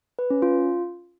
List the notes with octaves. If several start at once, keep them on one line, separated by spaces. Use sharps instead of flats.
B4
C#4
F4